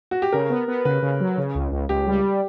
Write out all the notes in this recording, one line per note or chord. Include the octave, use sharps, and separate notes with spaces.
F#4
G4
C#3 A#4
B3
B3
C#3 B4
C#3
F#3
C#3
C#2
C#2
C#2 G4
G3